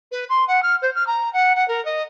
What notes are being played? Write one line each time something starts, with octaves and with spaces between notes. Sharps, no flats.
B4
C6
F#5
F6
C5
F6
A#5
F#5
F#5
A#4
D#5